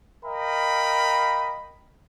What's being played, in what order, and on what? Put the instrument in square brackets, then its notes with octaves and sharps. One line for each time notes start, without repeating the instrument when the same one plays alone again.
[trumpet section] A#4 D#5 F5 G5 B5